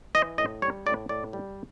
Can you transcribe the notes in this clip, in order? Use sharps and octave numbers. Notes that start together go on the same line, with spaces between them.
E3 D#5
A2 D#5
G3 C#5
A2 D5
A2 D5
G3